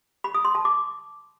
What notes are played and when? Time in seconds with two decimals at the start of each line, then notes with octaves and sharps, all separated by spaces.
0.24 B5
0.34 D#6
0.45 C6
0.55 A5
0.65 D6